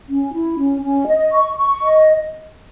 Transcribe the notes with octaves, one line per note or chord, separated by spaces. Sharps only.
C#4
E4
C#4
C#4
D#5
C#6
C#6
D#5